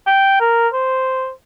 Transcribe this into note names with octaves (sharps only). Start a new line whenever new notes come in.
G5
A#4
C5